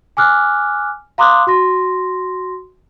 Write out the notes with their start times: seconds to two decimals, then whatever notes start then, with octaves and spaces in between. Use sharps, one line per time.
0.17 G#5 D6 F6 F#6
1.18 F5 A#5 C6 D6 D#6 F#6
1.47 F#4 C6 A#6